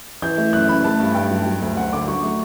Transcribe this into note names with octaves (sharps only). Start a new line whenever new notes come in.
E3 G6
A3
F#2 F#6
C#3 B5
A3 A5
G2
G2 G5
F#3
F#3
D2
D2 F#5
D3 D6
F#3 C#6
A3